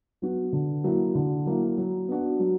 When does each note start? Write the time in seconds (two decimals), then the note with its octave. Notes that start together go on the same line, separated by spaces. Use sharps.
0.22 F#3 B3 F#4
0.53 D3
0.84 F#3 A#3 E4
1.15 D3
1.46 F#3 A#3 E4
1.78 F#3
2.08 B3 D4 F#4
2.39 F#3